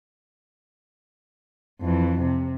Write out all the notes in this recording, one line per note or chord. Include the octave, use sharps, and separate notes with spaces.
F2 E3
C3